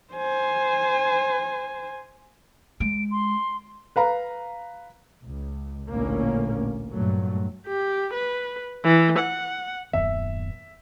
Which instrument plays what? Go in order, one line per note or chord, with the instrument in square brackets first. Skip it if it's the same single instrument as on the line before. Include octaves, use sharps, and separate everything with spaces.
[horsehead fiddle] C5 G#5
[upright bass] G#3 [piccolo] D7
[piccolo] C6
[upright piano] B4 F5 A#5
[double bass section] C#2
A1 D2 A#2 A#3 C#4
G2 A#2 F#3 A3
[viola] G4
B4
E3
F#5
[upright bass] D#1 A2 [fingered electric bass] F#2 D#3 B3 [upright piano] E5